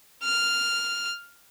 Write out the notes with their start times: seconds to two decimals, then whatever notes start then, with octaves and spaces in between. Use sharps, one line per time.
0.24 F6